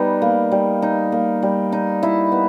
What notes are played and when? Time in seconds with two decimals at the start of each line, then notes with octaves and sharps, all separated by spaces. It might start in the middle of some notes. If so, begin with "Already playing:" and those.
Already playing: G3 B3 D#4
0.22 A#3
0.52 G3
0.82 D#4
1.12 A#3
1.43 G3
1.72 D#4
2.03 E4
2.32 B3